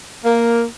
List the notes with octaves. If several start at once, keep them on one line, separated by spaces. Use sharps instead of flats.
A#3